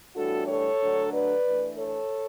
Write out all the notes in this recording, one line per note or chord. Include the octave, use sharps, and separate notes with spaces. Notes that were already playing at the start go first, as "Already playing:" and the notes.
A2 E3 G3 D4 F#4 A4
A4 C#5
D3 F#3 A3 D4
B4 D5
E3 A3 D4
A4 C#5